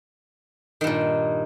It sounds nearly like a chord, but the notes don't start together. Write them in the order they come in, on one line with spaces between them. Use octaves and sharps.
D#3 G2 A#2